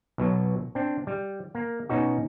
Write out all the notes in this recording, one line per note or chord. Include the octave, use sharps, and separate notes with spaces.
B1 B2 F#3
C4 D4
G3
A#3
B2 C#4 D#4 F#4